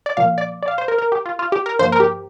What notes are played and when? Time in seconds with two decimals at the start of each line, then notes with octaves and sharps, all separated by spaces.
0.06 D5
0.17 A#2 F3 A#3 F5
0.38 D5
0.63 D5
0.68 F5
0.78 C5
0.88 A#4
0.98 A#4
1.12 G4
1.26 F4
1.39 F4
1.52 G4
1.66 A#4
1.79 G2 F3 A#3 C5
1.92 A#4
2.00 G4